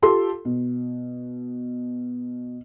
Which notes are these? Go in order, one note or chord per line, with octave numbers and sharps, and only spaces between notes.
F4 G4 A4 C6
B2